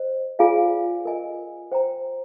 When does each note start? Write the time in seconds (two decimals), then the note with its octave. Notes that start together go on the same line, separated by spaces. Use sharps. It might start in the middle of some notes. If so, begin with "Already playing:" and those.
Already playing: C5 D#5
0.39 F4 G#4 D5 F5 G#5
1.05 A#4 D#5 G#5
1.72 C5 G5 A#5